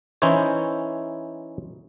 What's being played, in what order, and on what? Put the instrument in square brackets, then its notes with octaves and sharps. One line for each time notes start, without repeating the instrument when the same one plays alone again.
[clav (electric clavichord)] E3 C#4 D#4 E4 C5 C#5